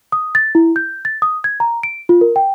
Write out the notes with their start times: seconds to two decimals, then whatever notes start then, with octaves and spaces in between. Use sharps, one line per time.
0.12 D#6
0.35 A6
0.55 E4
0.76 G6
1.05 A6
1.22 D#6
1.44 G#6
1.60 A#5
1.83 D7
2.09 F4
2.21 A#4
2.36 G5